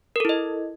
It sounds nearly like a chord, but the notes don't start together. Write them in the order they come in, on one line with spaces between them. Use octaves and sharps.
A#4 A4 E4 D#5